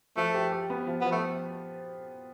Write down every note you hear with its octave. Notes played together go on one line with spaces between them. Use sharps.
F3 A3
G4
G4
B3
F3
F3 B3
A3